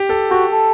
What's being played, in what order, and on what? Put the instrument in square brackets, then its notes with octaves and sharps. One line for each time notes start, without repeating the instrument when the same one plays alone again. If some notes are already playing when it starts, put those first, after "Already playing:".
Already playing: [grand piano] G4
A4
[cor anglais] F#4 [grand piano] G4
[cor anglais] A4